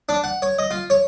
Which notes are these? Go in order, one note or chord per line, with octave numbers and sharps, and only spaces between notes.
D4
F#5
C#5
D#5
F4
C#5